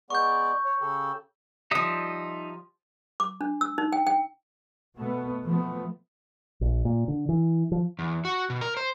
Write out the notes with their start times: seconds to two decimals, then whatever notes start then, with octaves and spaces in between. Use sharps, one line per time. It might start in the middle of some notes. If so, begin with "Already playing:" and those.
0.10 G#3 B3 D5 C#6 G6
0.65 C#5
0.81 C#3 G4 A4
1.71 F3 G3 D#4 E5 D#6
3.20 D6
3.41 D4
3.61 E6
3.78 D#4
3.92 G5
4.07 G5
4.95 B2 A3 B3
5.43 F3 A3 B3
6.61 A#1
6.85 A#2
7.08 D3
7.29 E3
7.72 F3
7.99 E2
8.25 F#4
8.50 B2
8.61 A#4
8.77 C5